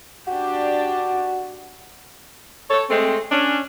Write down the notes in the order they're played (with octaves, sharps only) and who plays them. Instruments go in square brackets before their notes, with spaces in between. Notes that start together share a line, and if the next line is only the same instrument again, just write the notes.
[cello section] D4 G4 [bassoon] F#4
[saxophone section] A4 C#5
G#3 A3 C4
C#4 D4